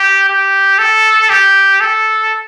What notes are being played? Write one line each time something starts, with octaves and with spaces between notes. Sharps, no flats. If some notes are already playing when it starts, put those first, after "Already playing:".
Already playing: G4
G4
A4
G4
A4